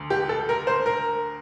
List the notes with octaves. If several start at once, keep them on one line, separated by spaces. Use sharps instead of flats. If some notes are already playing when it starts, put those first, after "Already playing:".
Already playing: D2
G4
A4
A#4
C5
A#4